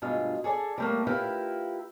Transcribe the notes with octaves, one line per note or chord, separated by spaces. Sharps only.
D2 G2 B2 G#3 F4
G#4 A4 D5 G#5
G3 A3 A#3
E4 F4 G4 A#4 B4 F5